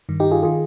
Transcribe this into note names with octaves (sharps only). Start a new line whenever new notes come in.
G2 D#3
D#4 G4
F4 G#4
D#3 F4 G#4